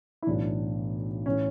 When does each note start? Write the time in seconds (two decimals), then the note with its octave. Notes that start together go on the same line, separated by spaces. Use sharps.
0.22 E4
0.27 B1 A2 E3 D4
1.26 A2 E3 C#4